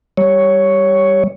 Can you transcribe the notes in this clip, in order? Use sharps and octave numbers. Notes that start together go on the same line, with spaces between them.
G3 C#5